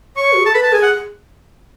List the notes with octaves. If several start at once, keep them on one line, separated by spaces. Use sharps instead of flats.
C#5 C#6
F#4
G#4
A4 A5
B4 B5
A5
G#4 G#5
F#5